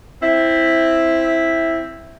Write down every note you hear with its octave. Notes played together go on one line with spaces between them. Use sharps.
C4 E4 E5